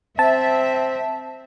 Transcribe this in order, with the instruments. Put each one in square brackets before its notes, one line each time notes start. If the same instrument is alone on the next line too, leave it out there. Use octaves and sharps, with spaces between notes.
[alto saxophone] C4 [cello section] E5 [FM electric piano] A5